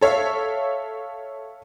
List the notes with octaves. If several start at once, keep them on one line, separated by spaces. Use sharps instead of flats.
A4 C#5 E5 F5